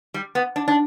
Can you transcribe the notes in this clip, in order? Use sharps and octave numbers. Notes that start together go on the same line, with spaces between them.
G3
B3
D4
D4